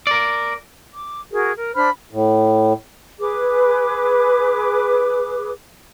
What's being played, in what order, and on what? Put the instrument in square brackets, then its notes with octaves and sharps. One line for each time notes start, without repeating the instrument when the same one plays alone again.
[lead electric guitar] A#4 D5
[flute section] D6
F#4 G#4 A#4
A#4
D4 C5 B5 F6
[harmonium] A2
[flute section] G#4 B4 D6